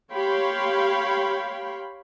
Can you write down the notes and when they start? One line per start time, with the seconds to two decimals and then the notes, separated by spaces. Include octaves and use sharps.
0.13 G4 C#5 F5 G5 B5 C6